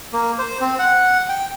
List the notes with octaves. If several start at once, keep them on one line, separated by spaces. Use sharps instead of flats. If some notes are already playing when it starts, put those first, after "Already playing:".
A#3
C5
C4
F#5
G5